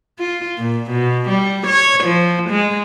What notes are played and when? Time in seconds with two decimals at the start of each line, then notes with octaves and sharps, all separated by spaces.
0.19 F4
0.58 A#2
0.91 B2
1.29 G3
1.67 C#5
2.04 F3
2.50 G#3